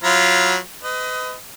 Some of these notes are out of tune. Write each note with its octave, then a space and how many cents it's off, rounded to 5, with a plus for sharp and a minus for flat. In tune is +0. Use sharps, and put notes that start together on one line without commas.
F#3 -20 F4 -15 B5 -45
B4 +35 D#5 +15